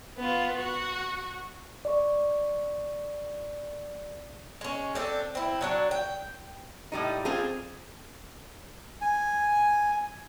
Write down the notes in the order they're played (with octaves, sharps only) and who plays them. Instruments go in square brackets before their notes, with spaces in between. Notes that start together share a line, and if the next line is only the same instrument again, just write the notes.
[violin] B3 F4
F#4
[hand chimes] D5 C#6
[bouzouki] G#3 C#4
C4 D4 A4
C4 E4
F#3 D4 F#4
G5
[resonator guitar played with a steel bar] A2 G3 D#4
C4 F4 G#4
[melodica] G#5